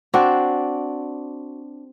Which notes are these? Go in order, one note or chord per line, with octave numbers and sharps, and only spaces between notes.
C4 D4 F#4 D5